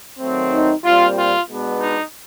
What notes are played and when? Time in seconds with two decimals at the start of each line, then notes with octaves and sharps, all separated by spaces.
0.20 D#3 F#3 A3 C4
0.51 D#4
0.84 A#2 G3 C4 F4
1.17 F4
1.48 B2 G#3 B3 D4
1.80 D#4